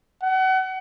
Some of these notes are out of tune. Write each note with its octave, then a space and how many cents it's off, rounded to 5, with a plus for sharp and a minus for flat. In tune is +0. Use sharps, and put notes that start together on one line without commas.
F#5 +35